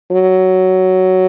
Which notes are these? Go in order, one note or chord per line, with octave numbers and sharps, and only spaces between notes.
F#3